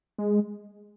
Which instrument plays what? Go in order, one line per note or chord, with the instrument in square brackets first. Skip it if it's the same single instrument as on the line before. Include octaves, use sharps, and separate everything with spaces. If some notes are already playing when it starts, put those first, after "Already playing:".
[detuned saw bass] G#3